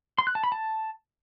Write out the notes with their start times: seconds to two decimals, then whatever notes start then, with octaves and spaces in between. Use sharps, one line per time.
0.18 C6
0.27 F#6
0.35 A5
0.44 B5
0.52 A5